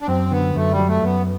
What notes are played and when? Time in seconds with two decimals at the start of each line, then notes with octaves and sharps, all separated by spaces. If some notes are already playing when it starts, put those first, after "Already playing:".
0.01 D4
0.07 F#2 C4
0.31 D3 B3
0.55 F#2 A3
0.71 G3
0.79 F#3
0.88 A3
1.03 F#2 B3